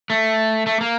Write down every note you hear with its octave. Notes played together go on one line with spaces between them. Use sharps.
A3
A3
A#3